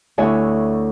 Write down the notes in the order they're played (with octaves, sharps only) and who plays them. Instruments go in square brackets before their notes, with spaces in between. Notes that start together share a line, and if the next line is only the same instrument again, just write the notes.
[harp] D2 E4 C#5 E5 G#5